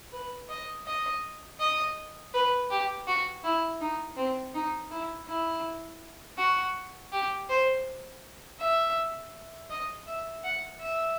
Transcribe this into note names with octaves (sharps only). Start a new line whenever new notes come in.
B4
D#5
D#5
D#5
B4
G4
F#4
E4
D#4
C4
D#4
E4
E4
F#4
G4
C5
E5
D#5
E5
F#5
E5